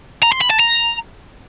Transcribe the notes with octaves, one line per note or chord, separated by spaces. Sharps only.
A#5
C6
B5
A5
A#5